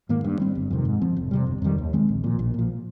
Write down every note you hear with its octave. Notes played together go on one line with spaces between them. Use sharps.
G#2 D#3 A#3
G2
G3 C4
G1
F2 C3 D#3
G#2
F3 C4
F1
F2 C3 G3
G1
F2 D#3 G3
D#2
D#3 G#3 C4
A#1
A#2 F3
A#1
A#2 F3